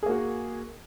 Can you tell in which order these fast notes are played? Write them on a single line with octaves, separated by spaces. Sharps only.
G#4 A#3 F#4